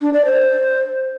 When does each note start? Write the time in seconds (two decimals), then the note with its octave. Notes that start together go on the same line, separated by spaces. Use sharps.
0.01 D4
0.13 D5
0.25 C5